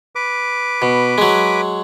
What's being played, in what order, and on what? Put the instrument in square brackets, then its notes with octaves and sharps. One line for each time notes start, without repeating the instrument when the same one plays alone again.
[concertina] B4 D6
[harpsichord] B2
F#3 G#3